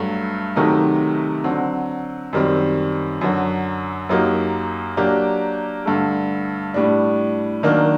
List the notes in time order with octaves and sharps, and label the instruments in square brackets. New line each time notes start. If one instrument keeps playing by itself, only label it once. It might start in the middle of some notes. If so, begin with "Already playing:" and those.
Already playing: [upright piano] G2 F#3 A3
C3 D#3 F#3 A3 D#4
D3 F#3 C4
F#2 D#3 G3 C4
F#2 D3 F#3
F#2 F#3 A#3 D#4 G4
F#3 A#3 D4 G4
G2 D3 A3
A2 G3 D4
D#3 F#3 A#3 D4